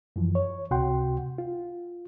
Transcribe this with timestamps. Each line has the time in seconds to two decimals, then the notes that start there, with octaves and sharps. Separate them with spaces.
0.16 F#2 E3 F3
0.35 C#5
0.71 C#2 C3 F#4 F#5 G5 C6
1.38 F4